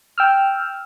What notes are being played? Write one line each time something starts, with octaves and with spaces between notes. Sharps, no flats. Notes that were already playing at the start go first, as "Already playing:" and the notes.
G5 E6 F6